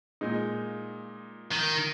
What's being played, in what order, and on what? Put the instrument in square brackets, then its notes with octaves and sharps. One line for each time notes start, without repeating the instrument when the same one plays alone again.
[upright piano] A#2 G#3 D#4
[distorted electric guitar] D#3